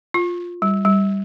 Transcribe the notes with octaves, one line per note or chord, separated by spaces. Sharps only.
F4
G3
G3